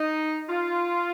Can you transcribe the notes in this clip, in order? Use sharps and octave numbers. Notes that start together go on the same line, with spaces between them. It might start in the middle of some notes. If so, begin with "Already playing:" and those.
Already playing: D#4
F4